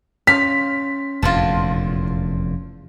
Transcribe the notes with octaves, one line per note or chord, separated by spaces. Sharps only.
C#4 C#5 F5 C6 B6
F1 E2 A#2 F4 F#5 A5